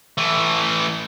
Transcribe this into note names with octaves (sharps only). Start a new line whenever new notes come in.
E3 A3